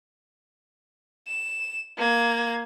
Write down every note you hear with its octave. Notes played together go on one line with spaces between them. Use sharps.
E7
A#3 G#6